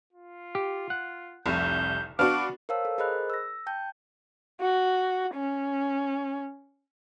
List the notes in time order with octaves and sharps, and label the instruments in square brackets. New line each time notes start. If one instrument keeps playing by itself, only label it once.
[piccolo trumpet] F4
[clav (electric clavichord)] G4
F#5
[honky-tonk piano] F1 C2 [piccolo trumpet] G6
[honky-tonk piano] B3 D4 F#4 [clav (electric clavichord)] F5 A5 [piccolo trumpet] D6
[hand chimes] A#4 C5 C#5 F5 A5 E6
A4
G#4 A#4 C5 D#5 B5 F#6
E6 A#6
G5 A5 G6
[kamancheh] F#4
C#4